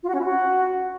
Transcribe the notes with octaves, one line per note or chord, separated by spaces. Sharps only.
F4
F#4
C#4
E4
F#4